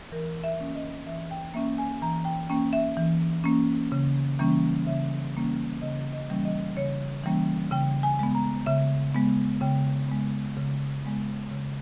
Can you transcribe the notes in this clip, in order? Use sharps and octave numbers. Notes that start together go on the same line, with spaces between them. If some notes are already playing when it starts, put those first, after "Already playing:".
E3 A#4
E5
A#3 C#4
D#5
E3 E5
G5
A#3 C#4 E5
G#5
E3 A#5
G5
A#3 C#4 G5
E5
E3
A#3 C#4
C#3
E3 G3 A#3 C#4
C#3 E5
E3 G3 A#3 C#4
C#3 D#5
D#5
E3 G3 A#3 C#4
D#5
C#3 C#5
E3 G3 A#3 C#4
C#3 G5
G#5
G#3 B3
A#5
C#3 E5
G#3 B3
C#3 G5
G#3 B3
C#3
G#3 B3
C#3